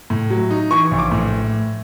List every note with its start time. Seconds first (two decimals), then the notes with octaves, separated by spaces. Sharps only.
0.10 A2
0.30 F#3
0.51 D#4
0.70 E3 C#6
0.91 A#1
0.98 D6
1.11 A2